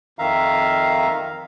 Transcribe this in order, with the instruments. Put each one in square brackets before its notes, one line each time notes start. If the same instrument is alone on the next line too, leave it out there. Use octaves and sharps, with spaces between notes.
[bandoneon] F2 D#3 E5 F5 A#5